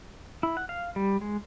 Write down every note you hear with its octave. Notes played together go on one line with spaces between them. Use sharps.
E4
F#5
F5
G3
G#3